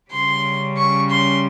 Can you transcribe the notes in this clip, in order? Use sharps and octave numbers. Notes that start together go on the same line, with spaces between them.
C#3 G3 C#4 C6
C#6
C6